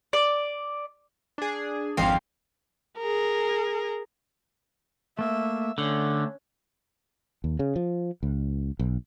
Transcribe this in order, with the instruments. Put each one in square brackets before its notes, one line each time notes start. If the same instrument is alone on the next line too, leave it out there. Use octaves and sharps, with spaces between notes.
[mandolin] D5
[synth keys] D4 G#4
[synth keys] G#1 F5 C7 [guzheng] F2 C4
[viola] G#4 A#4
[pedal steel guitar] A3 A#3 [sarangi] E5
[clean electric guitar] D3 [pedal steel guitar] A3 [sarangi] C#4
[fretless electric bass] D#2
C#3
F3
C#2
B1